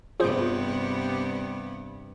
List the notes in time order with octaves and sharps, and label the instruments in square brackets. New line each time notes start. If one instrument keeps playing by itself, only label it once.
[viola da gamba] G2 C3 B3 [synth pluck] F4 G#4 C5